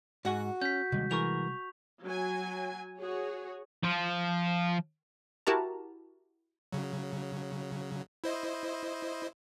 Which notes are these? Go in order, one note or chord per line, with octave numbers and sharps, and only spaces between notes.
G#2 F#4 F#5 G#5
C#4 G6 B6
D#2 C3 G3 G#3
E3 G#4 A#4 C#6 F7
F#3 G#5
F#4 G#4 C#5
F3
E4 F#4 G4 A#4 A5 A#5
C#3 F#3
E4 C5 D#5